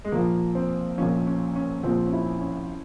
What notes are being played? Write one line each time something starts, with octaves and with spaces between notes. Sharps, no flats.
G#3
A#1 A#2 F3 A#3
C4
A#1 A#2 F3 C#4
C#4
C#4
A#1 A#2 F3 C4
C#4
E4
C#4